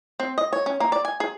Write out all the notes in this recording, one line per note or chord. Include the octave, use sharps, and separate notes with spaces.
C4
D#5
C#5
C#4
A#3
D5
G#5
G#4